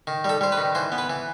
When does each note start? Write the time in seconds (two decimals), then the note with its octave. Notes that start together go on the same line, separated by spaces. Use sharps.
0.07 D#3
0.24 G3 A4
0.41 G3 C5
0.52 B4
0.58 D#3
0.75 E3 C5
0.92 B3
0.98 B4
1.10 E3